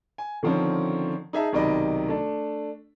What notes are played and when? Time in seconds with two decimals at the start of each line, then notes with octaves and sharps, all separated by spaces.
0.18 G#5
0.43 D3 D#3 F3 C4 C#4
1.33 D#4 G#4 E5 A5
1.52 B1 C3 D#3 D5 D#5 B5
2.08 A3 D4